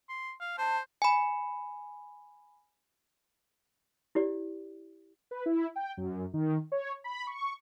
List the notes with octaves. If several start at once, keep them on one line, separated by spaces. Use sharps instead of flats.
C6
F5
C5 A5
G#5 B5
E4 G4 D5
B4
E4
G5
F#2
D#3
C#5
B5
C#6